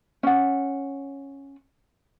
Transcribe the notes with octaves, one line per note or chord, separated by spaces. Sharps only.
C#4 F#5